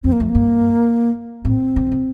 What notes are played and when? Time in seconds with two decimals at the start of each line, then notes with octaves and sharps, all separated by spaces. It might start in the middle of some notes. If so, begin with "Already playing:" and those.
0.04 F2 C4
0.12 A#3
0.20 F2 A3
0.29 A#3
0.35 G2
1.45 A2 C4
1.76 C3
1.86 D3
1.92 C3